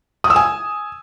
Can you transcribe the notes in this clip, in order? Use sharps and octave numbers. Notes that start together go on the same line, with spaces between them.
D#6
E6
G#5